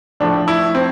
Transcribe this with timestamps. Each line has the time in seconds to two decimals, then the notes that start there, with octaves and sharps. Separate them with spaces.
0.20 A2 F3 A3 D4
0.48 E4
0.75 C4